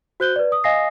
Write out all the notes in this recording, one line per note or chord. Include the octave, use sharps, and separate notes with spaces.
F#4 C5 F#6 G6 G7
B4 D5
D#6
D#5 F5 G#5 D#6 A#6 C7